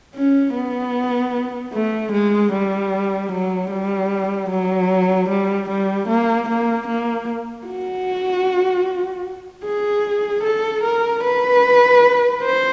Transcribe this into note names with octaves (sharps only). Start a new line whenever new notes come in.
C#4
B3
A3
G#3
G3
F#3
G3
F#3
G3
G3
A#3
A#3
A#3
F#4
G#4
A4
A#4
B4
C5